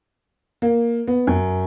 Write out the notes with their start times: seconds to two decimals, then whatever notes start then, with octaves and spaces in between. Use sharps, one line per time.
0.62 A#3
1.08 B3
1.27 F#2